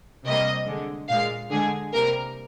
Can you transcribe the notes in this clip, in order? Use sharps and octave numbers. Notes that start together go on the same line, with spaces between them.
C3 G3 A#3 D#5
D3 G#3
A#2 G#3 F5
D3 G#3 G#4
C3 G3 A#3 A#4